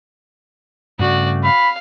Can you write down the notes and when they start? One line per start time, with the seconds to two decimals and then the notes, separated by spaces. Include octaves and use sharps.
0.99 G2 C#3 A3 F#4 D5
1.44 F5 B5